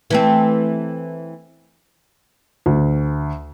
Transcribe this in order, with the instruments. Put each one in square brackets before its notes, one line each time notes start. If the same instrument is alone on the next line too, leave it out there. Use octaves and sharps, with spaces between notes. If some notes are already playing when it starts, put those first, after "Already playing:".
[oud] E3 A3 C4
[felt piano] D2